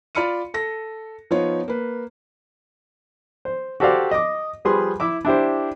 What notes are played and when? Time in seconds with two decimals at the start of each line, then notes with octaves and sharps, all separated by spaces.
0.15 F4 D5 B5 F6 C#7 D#7
0.54 A4 A#6
1.31 F3 B3 D#4 F4 C#5
1.68 A#3 B4
3.45 C5
3.80 F#4 G4 A4 C5 D5 F5
4.11 D#5 D6
4.65 F3 G3 G#4 B4 C6
5.00 E4 E5 D6
5.25 D4 E4 G4 C5